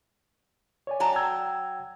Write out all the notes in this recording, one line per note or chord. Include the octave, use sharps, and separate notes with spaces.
C#5 D5 G#5
F#3 A5 A#5
G5 E6 G#6